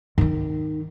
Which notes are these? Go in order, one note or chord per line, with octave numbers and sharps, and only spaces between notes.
D#3 D#4